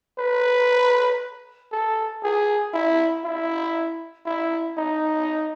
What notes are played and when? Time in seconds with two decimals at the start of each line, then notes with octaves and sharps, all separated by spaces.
0.19 B4
1.72 A4
2.23 G#4
2.74 E4
3.24 E4
4.26 E4
4.78 D#4